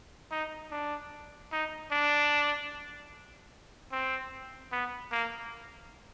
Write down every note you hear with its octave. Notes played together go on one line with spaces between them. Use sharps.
D#4
D4
D#4
D4
C4
B3
A#3